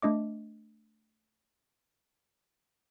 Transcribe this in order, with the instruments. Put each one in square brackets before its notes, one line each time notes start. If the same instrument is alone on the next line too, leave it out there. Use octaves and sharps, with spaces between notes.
[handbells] A3 D4 D#5 D6